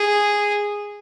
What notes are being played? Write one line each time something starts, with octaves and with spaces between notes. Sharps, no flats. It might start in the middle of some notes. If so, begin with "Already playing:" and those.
Already playing: G#4